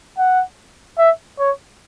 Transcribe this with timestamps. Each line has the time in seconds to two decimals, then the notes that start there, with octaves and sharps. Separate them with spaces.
0.18 F#5
0.98 E5
1.39 C#5